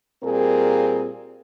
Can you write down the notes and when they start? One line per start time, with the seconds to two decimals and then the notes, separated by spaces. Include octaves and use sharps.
0.23 A#2 G3 C4 G#4 A#4